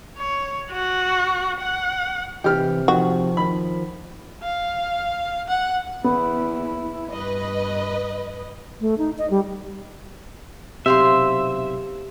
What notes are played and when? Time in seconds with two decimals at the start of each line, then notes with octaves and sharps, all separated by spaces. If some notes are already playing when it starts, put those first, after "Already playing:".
0.17 C#5
0.71 F#4
1.61 F#5
2.44 C3 E3 G4 F6
2.88 D#3 F3 F#4
3.37 D#3 B5
4.42 F5
5.48 F#5
6.04 E2 B3 E4
7.12 G2 B4 D#5
8.81 A3
8.98 D#4
9.18 D#5
9.30 G3
10.86 B1 C3 G4 C5 E5 F5 C6